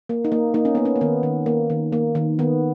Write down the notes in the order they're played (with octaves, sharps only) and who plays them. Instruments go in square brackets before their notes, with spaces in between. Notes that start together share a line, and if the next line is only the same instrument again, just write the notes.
[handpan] A#3
D#4
A#3
A#3 D#4
C#4
A#3 B3
C#4
A#3
D#3 B3
D#3
A#3
D#3
A#3
D#3
D#3 B3